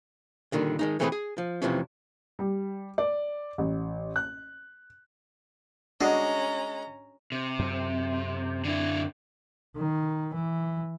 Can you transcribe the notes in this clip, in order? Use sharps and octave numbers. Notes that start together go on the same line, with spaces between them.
A#2 D3 D#3 G3
D#3 G#3 D#4
E3 A3 C4 F#4 G#4 B4
G#4
F3
F2 C3 E3 F3 C#4
G3
D5
A1
F#6
G#3 C#4 D4 F#4 D#5 A#5
C3
F#2 C4
D3 E4
D#3
E3